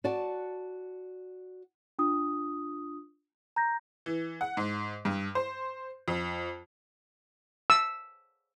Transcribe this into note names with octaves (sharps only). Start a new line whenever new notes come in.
F#4 D5 F#5 A5
D4 F4 D#6
A#5 G6 A#6
E3
F#5
G#2
G2
C5
F2
E6